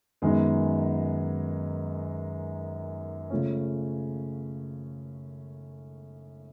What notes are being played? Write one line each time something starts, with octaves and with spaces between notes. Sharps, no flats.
F#2 D#3 G#3 B3 D#4
C#3 F3 A3 C#4